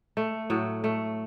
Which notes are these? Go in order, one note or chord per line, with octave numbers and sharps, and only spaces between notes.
A3
A2 F#3
A3